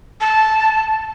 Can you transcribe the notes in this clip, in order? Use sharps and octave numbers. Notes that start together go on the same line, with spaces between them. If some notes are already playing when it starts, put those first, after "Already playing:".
A5